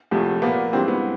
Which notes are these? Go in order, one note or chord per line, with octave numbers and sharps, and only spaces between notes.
E2 C3 F3 A3
A#2 F3 A#3 B3
G2 E3 G#3 C4
B3